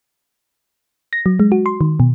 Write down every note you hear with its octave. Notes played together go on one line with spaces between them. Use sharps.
A#6
F#3
G#3
F#4
C6
D#3
B2